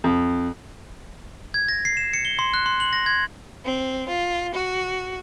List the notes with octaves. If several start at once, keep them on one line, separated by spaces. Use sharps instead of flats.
F2
G#6
A#6
C7
E7
C#7
G7
C6
F#6
C6
F#7
A#6
G#6
C4
F4
F#4